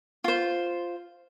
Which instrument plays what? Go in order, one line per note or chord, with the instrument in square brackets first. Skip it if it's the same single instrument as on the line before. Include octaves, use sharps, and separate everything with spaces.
[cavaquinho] F4 C5